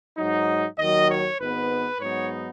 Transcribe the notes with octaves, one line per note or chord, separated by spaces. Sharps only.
G#2 F#3 D#4
D#2 D#3 F#3 D#5
C#5
G#1 G#2 G#3 B3 B4
G#2 F#3 B3 D#4 C#5